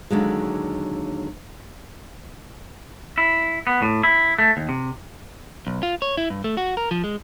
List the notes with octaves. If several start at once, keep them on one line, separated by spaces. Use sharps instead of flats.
D#2 D3 F#3 G#3
E4
B3
A2
E4
A3
D#2
C3
B1
F4
C#5
E4
G2
A3
F#4
A#4
F3
G#3